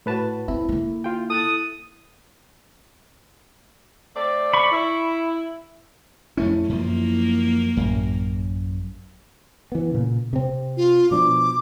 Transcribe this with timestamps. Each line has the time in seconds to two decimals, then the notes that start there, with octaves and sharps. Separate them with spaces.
0.06 A2 A3 F#4 B4 A5
0.48 C4 E4
0.69 D3 A#3
1.04 F4 G5
1.30 A4 D#6 F#6 A6
4.16 A3 C4 D5
4.54 B5 C#6
4.71 E4
6.37 F2 A3 C#4 E4
6.69 F#2 F3 A#3
7.77 A1 F#2
9.72 E3 B3
9.91 A#2 C#3
10.33 C3 C4
10.77 F4
11.11 B2 F3 D4 D6